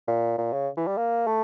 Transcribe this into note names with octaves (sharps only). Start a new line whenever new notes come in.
A#2
A#2
C#3
E3
G3
A#3
A3